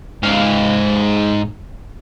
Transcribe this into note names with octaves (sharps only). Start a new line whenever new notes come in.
G#2 F5